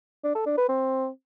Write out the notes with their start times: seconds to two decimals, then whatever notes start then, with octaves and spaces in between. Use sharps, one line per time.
0.24 D4
0.35 A4
0.46 D4
0.57 B4
0.68 C4